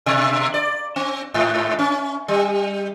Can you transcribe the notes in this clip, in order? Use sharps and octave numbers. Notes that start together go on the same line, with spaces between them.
B2
D5
C4
G#2
C#4
G3